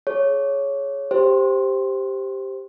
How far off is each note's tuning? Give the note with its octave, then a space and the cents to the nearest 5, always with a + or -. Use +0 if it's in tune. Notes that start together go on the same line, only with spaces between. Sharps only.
G#4 +30 C#5 +0
G4 +0 C5 +0